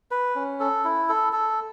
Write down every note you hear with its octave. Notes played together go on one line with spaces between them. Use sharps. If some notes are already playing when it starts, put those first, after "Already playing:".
B4
C#4
A4
E4
A4
A4